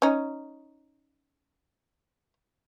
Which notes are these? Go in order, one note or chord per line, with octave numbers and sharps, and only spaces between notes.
C#4 D#4